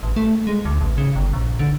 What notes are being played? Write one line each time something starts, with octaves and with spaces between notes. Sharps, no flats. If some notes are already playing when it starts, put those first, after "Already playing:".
A1
A3
G#3
D2
A1
C#3
G1
A#1
D3